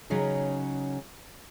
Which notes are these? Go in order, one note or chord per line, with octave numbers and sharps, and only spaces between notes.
C#3 F#3 C#4 D#4 G#4